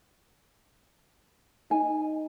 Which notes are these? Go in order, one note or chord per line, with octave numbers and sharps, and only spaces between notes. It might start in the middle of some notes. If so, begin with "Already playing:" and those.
D#4 G#5